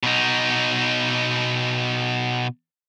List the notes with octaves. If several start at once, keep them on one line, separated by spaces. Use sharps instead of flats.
B2 D#4